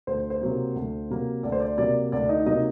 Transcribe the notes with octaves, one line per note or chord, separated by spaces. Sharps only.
D2 C5
C5
C3 F#3 A#3
D2
C3 F#3 A#3
D2 D5
C5
D5
C3 F#3 A#3 D5
D2 D5
D#4 D#5
C3 F#3 A#3 D#4 D#5